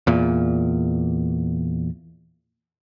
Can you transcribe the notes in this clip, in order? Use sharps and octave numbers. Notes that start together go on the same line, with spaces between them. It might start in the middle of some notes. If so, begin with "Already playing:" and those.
E2 A#2